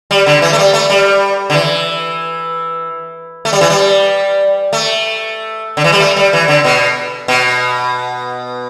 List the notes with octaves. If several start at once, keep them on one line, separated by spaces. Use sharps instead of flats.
G3
D3
E3
A3
G3
A3
G3
D3
E3
A3
G3
E3
G3
A3
D3
E3
G3
A3
G3
E3
D3
B2
B2